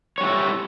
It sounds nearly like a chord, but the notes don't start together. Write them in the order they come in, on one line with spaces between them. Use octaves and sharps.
C#5 G3 E4